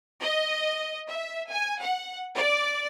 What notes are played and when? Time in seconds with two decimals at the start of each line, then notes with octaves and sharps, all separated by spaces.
0.23 D#5
1.09 E5
1.51 G#5
1.82 F#5
2.37 D5